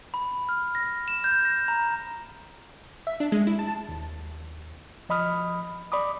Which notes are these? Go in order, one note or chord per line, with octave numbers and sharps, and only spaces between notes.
B5
F6
A#6
E7
G6
A#6
A#5
E5
D4
G#3
E4
A5
D#2
F3 D#5 B5 D#6 F6
D5 B5 D6 D#6